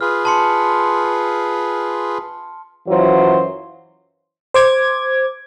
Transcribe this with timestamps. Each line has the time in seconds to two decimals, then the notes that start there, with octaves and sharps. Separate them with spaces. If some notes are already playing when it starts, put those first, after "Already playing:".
0.01 F4 G#4 B4 F6
0.25 A5 C6 C#7
2.88 F#2 E3 F#3 F4 F#4 C5
4.54 C5 D6 G#6